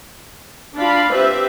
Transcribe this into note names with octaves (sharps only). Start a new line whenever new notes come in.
D4 F4 F5 B5
C4 G4 B4 E5